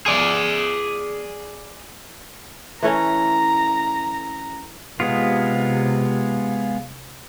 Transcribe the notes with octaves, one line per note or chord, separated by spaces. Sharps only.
G#4 D5
E3 A3 C#4 A#5
C3 G#3 B3 F4